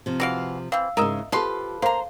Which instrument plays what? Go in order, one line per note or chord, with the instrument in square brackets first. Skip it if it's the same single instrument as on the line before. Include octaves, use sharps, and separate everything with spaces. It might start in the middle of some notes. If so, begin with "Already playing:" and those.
[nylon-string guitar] C3 F3
[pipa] E3 F#4 F5 [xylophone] A#6 D7
[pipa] E3 C4 [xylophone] F5 E6
[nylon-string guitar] G#2 C#3 [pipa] A#4 D#5 E5
[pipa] F3 B4 C6 [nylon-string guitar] F4 G4 A4
[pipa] A#3 A#5 [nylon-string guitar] C5 [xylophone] F5